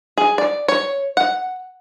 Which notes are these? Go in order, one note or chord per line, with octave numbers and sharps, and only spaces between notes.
G#4
D5
C#5
F#5